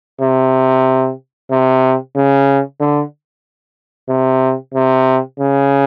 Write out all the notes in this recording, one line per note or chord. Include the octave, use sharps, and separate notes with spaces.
C3
C3
C#3
D3
C3
C3
C#3